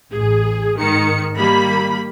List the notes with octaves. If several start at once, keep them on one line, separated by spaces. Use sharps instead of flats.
A1 G#4
G#2 D#3 C#7
D#3 G3 A#3 B5